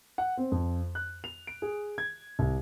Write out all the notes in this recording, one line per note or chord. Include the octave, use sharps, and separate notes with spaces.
F#5
C4
F2
F#6
F7
D7
G#4
G#6
C2